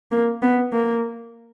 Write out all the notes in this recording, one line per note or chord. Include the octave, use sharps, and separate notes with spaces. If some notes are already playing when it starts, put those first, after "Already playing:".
A#3
B3
A#3